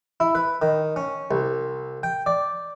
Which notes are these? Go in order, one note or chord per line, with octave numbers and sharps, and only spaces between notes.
E4
B4
D#3
C#4
C2
G5
D5